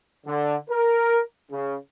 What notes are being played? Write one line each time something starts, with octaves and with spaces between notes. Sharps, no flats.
D3
A#4
C#3